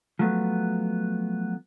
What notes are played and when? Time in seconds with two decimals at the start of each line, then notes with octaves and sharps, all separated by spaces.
0.19 F3 F#3 A3 B3